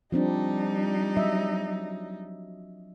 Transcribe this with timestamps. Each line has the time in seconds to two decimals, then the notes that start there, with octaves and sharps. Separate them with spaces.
0.12 F3 G3 C4 D4 D#4
1.17 F#3 D#5 E5